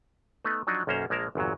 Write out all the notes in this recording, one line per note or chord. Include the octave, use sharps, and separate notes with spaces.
A3 B3 D#4 B4
F3 F#3 D4 D#4
B1 F#2 A#3 C#4 C5 A#5
A#1 G#3 A#3 A#4 A5 A#5
G1 E2 A#2 F#3